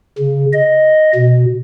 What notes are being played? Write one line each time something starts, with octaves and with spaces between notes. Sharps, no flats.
C#3
D#5
B2